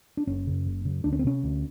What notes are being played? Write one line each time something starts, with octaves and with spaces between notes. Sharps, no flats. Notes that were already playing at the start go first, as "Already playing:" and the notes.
D4
F#1 C#4
F#2 C#3
F#1
F#2 C#3
D2 D4
C#4
C4
C3 C#4
D2